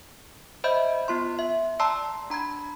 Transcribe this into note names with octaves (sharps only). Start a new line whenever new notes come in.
C5 D#5 E5 B5 G6
B3 F4 C6
E5
D5 A5 A#5 C6 E6 C7
D4 A#5 B5 G#6